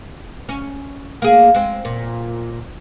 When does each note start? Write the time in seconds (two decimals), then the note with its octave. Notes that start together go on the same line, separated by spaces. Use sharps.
0.49 C#4
1.22 A#3 G#4
1.54 G#3 C4
1.85 A#2